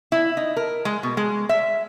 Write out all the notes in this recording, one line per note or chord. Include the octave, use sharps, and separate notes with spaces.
E4
D#4
A#4
G#3
B2
G#3
E5